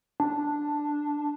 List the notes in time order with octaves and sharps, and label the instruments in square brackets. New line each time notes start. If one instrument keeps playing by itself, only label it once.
[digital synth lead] D4